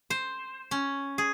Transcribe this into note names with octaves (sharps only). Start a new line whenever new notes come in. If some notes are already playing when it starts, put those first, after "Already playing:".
C5
C#4
G#4